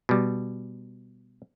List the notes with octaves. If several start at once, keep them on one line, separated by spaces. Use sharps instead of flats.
B2 G3